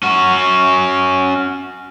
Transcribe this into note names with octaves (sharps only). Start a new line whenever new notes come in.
C#4 F#4